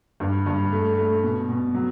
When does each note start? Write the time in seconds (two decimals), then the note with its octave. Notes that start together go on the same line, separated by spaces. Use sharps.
0.20 G2
0.46 G2
0.72 A3
0.97 A3
1.23 B2
1.49 B2
1.74 F#3